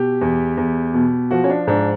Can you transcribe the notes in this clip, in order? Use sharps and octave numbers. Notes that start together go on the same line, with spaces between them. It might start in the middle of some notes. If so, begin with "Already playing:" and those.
Already playing: B2 G4
E2
E2
B2
F3 F#4
C#4
D4
G#2 D4